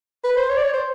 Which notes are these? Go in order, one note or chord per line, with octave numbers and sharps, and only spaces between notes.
B4
C5
C#5
D5
C#5
C5